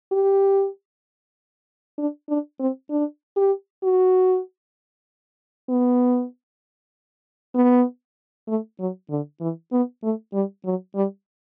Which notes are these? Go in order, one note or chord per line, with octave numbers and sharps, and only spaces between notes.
G4
D4
D4
C4
D4
G4
F#4
B3
B3
A3
F#3
D3
E3
B3
A3
G3
F#3
G3